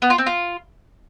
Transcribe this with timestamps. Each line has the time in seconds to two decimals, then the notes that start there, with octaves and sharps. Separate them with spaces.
0.02 B3
0.10 F4
0.18 C4
0.26 F4